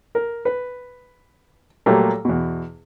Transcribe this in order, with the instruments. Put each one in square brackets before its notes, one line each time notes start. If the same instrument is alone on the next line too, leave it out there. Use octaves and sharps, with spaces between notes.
[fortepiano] A#4
B4
A#2 F#3 G3 A3 A#3
E2 B2